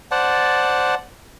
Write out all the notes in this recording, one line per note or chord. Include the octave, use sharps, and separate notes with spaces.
C5 D5 F#5 A5